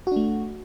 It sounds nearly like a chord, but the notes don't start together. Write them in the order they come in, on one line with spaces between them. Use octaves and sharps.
F#4 D4 A3